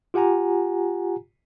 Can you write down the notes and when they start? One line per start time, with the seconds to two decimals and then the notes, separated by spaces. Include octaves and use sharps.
0.14 F4 G4 F#5 G#5 A#5